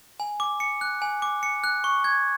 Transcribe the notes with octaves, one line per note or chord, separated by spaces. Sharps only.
G#5
D6
C#7
F#6
G#5
D6
C#7
F#6
C#6
G#6